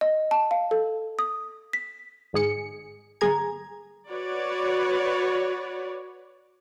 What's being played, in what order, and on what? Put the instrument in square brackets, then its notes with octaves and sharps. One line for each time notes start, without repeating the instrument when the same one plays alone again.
[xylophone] D#5
A5
F5
A4
D#6
B6
[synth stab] G#1 G#2 G#4 C#7
G1 G#4 A#5 G#6
[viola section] F#4 B4 C#5 D5